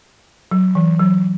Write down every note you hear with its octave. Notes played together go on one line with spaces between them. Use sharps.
F#3
E3
F#3